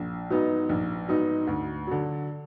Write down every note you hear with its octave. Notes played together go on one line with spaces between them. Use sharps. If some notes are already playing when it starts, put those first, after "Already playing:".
Already playing: A#1
G#2 F#3 B3 D#4
A#1
G#2 F#3 B3 D#4
D2
D3 F#3